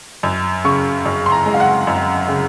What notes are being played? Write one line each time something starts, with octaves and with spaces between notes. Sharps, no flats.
F#2
C#3 C#6
F#2
C6
A#5
G#3
F5
F#5
F#2
C#3